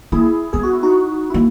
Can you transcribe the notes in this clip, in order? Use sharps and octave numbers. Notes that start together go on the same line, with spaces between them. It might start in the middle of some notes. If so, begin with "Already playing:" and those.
A#3 E4 G#4
B3 G#4
F#4
E4
D#4 F#4
E4
A#3